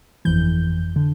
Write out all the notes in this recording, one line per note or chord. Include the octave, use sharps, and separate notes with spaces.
G1 F2 E3 G6
D3